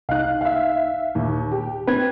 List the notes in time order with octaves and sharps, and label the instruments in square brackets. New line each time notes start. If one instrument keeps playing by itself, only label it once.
[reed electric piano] C2 D#4 [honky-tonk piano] F5 F#6
[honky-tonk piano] E5 F5
[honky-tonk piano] D#2 [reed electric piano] A#2
[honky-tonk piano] G4
[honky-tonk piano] C4 [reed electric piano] B4 G#6